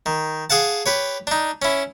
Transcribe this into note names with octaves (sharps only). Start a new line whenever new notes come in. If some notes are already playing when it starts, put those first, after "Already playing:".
D#3
G#4 F5 F#5 A5
G4 B4 C#5
D4 D#4
C#4 E4